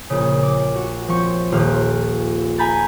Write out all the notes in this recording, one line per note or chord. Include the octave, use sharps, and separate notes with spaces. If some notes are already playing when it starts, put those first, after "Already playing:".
A#1 C#3
D6
F#4
F3 C4 C#6
D#1 F4 G4 F6 F#6
G#5 A#5 B5 G6 A6